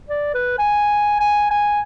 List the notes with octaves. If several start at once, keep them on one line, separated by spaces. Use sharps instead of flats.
D5
B4
G#5
G#5
G#5